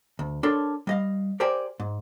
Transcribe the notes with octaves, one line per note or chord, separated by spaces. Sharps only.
D2
D4 A4 A#4 C#5 C6
G3 D#5 F5
G4 A#4 C5 D5 G5 G#5
G#2